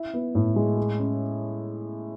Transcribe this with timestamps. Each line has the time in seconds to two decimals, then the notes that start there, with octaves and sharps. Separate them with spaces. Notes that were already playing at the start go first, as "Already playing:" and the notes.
Already playing: E4
0.14 B3
0.35 A2
0.56 G#3
0.77 G#4
0.99 C#4